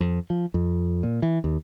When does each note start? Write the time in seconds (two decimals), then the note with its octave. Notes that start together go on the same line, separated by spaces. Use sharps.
0.01 F2
0.30 F3
0.54 F2
1.03 A#2
1.22 E3
1.44 D#2